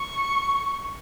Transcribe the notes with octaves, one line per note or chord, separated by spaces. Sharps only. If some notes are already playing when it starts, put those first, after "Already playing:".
Already playing: C#6